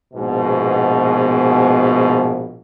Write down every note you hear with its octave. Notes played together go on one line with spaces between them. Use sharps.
A#1 G#2 B2